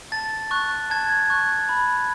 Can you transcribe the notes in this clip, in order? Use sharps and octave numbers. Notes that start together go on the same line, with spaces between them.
A5 A6
C#6 F#6
A5 G#6
C#6 F#6
B5